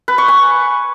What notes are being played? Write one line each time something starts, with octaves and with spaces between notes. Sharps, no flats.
B4
C#6
G#5